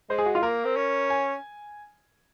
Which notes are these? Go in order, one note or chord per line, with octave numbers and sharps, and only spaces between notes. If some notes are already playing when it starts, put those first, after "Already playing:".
G#3 C5
G#4
F#4
F4
A#3 A#4
C4
C#4
G#5